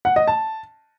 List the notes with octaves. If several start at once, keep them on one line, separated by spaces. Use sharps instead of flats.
F#5
D#5
A5